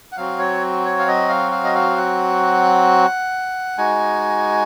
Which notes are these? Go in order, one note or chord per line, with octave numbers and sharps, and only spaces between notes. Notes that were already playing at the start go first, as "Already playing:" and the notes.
F#5
F#3 C4 F#4 F5
C#5
C#5
F5
D#5
F5
F5
D#5
F5
F#5
G#3 D#4 F#4 G#5